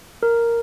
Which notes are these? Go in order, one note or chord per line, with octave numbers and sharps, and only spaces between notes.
A#4